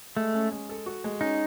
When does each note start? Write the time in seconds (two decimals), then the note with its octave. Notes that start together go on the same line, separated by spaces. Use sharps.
0.17 G#3 A3
0.34 C#4
0.52 G#3
0.69 A4
0.86 F#4
1.04 G#3
1.21 C#4 D#4